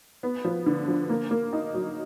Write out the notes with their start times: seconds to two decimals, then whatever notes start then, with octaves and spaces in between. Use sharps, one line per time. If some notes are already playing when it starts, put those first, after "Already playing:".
0.23 B3
0.45 F3
0.66 D3
0.88 F3
1.10 A#3
1.31 A#3
1.53 D#4
1.74 F#3